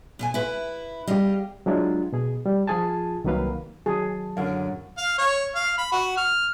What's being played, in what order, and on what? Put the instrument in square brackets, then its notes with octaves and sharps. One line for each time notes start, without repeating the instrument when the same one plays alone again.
[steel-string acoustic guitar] B2 E5 G#5
E4 B4
[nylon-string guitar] G3 G4 [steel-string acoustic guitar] D#5 F5
[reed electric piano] F#3 G#3 D4 E4 F4
B2 G#4
G3
F3 F4 G#4 G#5 A5
C2 D#3 F#3 A#3 B4 F5
[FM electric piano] D#3 F#3 A5 [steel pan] G#4
[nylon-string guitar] F#2 D3 [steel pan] F5
[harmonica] F5
C#5
F5
B5
F#4
F6